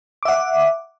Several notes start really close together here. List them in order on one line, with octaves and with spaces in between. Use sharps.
D6 E5 F#5